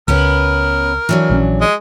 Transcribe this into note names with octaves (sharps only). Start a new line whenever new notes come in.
C#2 B3 C#4 A#4 B4
E3 F#3 D4
A#1 F3 C#4
G#3